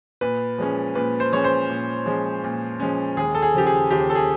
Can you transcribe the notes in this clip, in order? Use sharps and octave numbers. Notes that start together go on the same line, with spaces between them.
A#2 B4
F3 G#3 C#4
A#2 B4
C5
F3 G#3 C#4 C#5
C5
A#2
F3 G#3 C#4
A#2
F3 G#3 C#4
D#2 G#4
A4
G#4
C#3 F3 G4
G#4
D#2 G4
A4
G#4